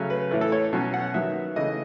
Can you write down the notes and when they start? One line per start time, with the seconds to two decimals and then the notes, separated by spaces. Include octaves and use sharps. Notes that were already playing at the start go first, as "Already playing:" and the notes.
Already playing: C#3 F#3 A3 C#4
0.10 B4
0.31 A2 E3 A3
0.41 A4
0.52 C#5
0.73 B2 F#3 C#4
0.94 F#5
1.14 D#3 F#3 B3 E5
1.56 C#3 E3 A3 D#5